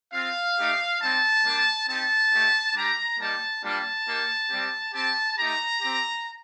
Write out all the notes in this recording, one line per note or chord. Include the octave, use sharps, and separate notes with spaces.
C4 F4 F5
A3 D#4 G4
G3 C4 D#4 A5
G3 A#3 D4
C4 D#4 G4 A5
A3 D#4 G4
G3 D4 G4 A#5
G3 A#3 D#4 G4 A5
G3 A#3 D4 F4 A5
A#3 D#4 G4
G3 C4 G4
C4 G4 A5
A3 D#4 G4 A#5
C4 G4